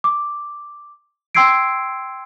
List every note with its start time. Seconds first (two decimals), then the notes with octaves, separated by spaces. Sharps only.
0.04 D6
1.35 G5 C6 E6 G#6 C7 D7